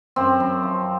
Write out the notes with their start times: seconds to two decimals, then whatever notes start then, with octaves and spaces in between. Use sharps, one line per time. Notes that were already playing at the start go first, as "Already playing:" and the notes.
0.16 F#2 C4
0.40 F#2
0.63 F3